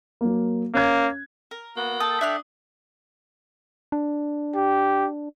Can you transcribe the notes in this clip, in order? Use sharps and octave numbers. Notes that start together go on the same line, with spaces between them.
F#3 A#3
A#3 C#4 F#6 G#6
A#4
A#3 B3 F#4
A4 G5 A5 D#6
D4 E5 F#5 F6
D4
G4